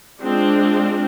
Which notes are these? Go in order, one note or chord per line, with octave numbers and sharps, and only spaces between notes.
G#3 C4 D4 F4